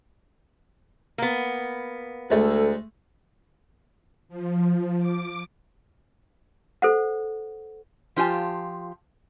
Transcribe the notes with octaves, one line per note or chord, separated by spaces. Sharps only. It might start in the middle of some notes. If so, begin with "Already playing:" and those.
A#3 B3
D2 G#3 A3 A4
F3
D6
A4 C5 F#5
F3 F4 G4 G#5 A5